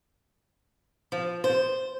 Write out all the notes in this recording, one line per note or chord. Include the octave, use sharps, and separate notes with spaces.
F3
C5